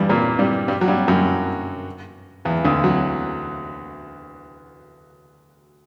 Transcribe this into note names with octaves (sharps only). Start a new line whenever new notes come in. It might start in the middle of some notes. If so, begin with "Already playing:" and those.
Already playing: E2 G2 E3 G3
A#2 A#3
G2 G3
G2 G3
F#3
G2 G3
F#2 F#3
E2 E3
D2 D3
F#3